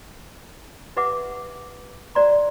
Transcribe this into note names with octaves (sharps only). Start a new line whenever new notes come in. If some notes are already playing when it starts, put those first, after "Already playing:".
G4 B4 E5 F#5 D6
F#4 C5 D5 A#5 C6